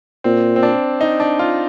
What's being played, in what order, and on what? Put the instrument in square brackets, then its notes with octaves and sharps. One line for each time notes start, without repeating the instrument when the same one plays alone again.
[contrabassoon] A#2 [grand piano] C4
[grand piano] C4
D4
D#4
D4
F4